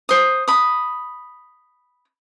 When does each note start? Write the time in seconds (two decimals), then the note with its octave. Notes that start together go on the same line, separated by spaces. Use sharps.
0.09 C5 D#6
0.48 B5 D#6